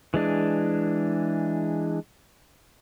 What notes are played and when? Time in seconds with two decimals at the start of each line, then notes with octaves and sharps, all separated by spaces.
0.14 E3 G#3 D4